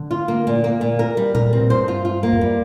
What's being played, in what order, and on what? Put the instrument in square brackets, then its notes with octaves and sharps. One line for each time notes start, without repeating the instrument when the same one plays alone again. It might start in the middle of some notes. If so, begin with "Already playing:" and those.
Already playing: [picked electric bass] D3
[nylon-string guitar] F4
A#3
A#2
A#3
A#2
A#4
G3
[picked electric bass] A#2 [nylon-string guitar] A#4
[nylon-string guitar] C4
[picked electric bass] A#2
[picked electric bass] G2 [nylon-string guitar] C5
[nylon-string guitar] F4
F4
A#3
[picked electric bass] F2
[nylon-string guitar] G3